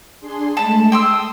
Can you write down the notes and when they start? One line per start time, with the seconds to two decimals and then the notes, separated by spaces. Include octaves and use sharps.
0.21 D4 G#4 C6
0.57 G#3 A3 A5 B5
0.92 G5 C6 D#6 E6